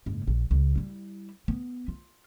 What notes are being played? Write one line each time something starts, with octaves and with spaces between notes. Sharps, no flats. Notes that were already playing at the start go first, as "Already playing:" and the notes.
F#1 G#2
A#1
C#2
G3 E4
B3
F4